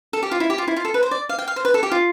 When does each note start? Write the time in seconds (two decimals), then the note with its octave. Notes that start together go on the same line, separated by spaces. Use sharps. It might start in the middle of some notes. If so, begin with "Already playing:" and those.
0.13 A4
0.23 G4
0.32 F4
0.40 E4
0.50 G4
0.58 F4
0.68 E4
0.76 F4
0.85 A4
0.94 B4
1.03 C5
1.11 D5
1.29 F5
1.39 G5
1.48 F5
1.56 C5
1.65 B4
1.74 A4
1.83 G4
1.92 F4